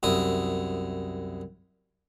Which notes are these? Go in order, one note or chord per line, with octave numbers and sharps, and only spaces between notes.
C2 F#2 E4 D#6